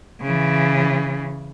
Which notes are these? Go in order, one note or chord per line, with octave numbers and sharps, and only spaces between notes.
C#3 E3